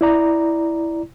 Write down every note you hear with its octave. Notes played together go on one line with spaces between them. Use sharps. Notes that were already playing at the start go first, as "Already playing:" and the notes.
E4 D5 A#5